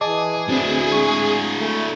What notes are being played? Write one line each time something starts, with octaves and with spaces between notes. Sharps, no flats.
E3 G#4 D#5 A5 D6
D2 C4 D4 E4 F#4
G#3 C#6
A3